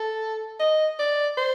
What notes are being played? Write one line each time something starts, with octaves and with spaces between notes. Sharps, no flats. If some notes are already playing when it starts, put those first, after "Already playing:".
Already playing: A4
D#5
D5
C5